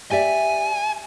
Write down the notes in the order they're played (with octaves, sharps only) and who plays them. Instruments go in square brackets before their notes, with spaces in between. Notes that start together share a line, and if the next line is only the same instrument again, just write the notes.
[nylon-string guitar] G4 D5 E5 [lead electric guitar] G#5